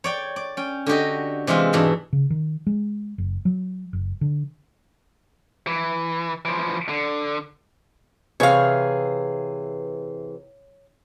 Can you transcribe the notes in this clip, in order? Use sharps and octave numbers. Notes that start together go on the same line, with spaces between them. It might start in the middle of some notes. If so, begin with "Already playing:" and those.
C#5 D5 G5
D5
C#4 G5
D3 F#4 G4 D#5
C3 E3 G#3 F4 E5
G#2 B2 E3 D4
C#3
D#3
G#3
F#1
F#3
F#1
D3
E3
E3 F3
D3
C3 E3 G#4 C#5 F5